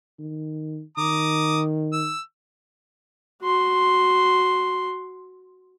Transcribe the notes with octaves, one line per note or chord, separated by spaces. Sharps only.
D#3
D#3 A#5 D6 D#6
E6
F#4 C6